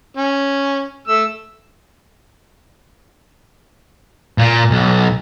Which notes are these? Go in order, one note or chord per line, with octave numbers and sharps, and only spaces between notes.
C#4
A3 E6
A#2
B1